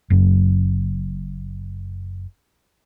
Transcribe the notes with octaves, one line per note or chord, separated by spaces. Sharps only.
F#1 F#2